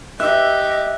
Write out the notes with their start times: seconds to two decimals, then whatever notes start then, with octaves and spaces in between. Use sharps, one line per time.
0.20 G4 D#5 E5 F#6